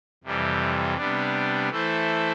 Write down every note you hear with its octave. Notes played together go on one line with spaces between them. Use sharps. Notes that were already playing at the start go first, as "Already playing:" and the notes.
F2 C3 E3 G3
C3 G3 B3 D4
E3 A3 E4 A4 C5